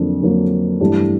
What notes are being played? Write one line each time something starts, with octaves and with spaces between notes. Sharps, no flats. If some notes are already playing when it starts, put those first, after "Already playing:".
Already playing: F2 D3 F#3 A#3 D4
F2 D3 F#3 A#3 D4
G2 E3 A3 D4 G4